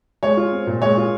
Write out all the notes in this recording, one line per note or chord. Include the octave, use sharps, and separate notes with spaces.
G#3 C#5
F4
C4
A#2
G#3 C#5
F4